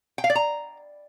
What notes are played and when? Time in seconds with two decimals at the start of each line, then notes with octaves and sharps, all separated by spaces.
0.18 G5
0.24 F5
0.30 D5
0.35 A#5